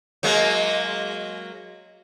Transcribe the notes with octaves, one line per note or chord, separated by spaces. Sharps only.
F#3 G#3 A#3